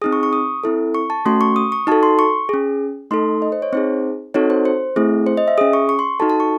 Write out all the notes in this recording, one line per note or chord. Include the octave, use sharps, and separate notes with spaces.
C4 D#4 G#4 D#6
C#6
C#6
D#6
C4 E4 A4
C#6
A5
A3 C#4 F#4 C6
C#6
D#6
C#6
D#4 F#4 A4 A5
C6
C#6
C#4 G#4
A3 D#4 A4 C6
D#5
C5
C#5
C4 D#4 G#4 C5
C4 D#4 F#4 A4 C#5
C5
C5
A3 C4 E4 G#4
C5
D#5
E5
C#4 G#4 D#6
C#6
C#6
C6
D#4 F#4 A4 A5
A5
C#6